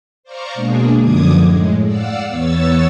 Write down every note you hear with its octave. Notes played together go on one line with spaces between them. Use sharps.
C5 D5 F5 A#5 C#6
B2 G#3 A#3 D4 G#4
F#2 D3 F3 D6 D#6 G#6
A2 G#3
D5 F5 F#5 E6
E2 B3 C#5 E6 A6